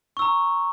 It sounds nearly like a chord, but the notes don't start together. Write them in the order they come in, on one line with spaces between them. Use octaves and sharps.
C#6 E6 A#5